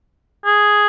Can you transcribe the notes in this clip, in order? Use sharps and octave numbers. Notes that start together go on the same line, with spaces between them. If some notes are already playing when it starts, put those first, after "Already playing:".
G#4